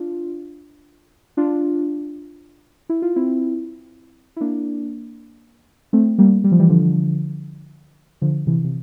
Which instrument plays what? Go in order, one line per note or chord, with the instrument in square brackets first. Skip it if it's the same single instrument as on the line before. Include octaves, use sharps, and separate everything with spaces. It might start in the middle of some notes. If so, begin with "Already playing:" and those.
Already playing: [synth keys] D4 F4
D4 F4
E4
F4
C4 E4
E4
A#3 D4
A3 C4
G3 A#3
G3
F3
E3 G3
D3 F3
D3 F3
C3 E3
C3